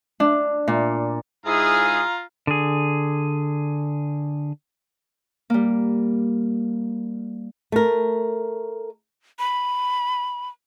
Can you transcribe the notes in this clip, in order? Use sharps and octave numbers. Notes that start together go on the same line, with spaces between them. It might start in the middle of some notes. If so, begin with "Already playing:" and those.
D4
A#2
G#2 E4 F4 G#4 F5 A#5
D3 G#4
G3 A#3
A3 A#4
B5